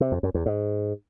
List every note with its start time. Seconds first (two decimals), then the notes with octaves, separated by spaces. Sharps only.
0.01 C3
0.12 F2
0.23 F#2
0.34 E2
0.46 G#2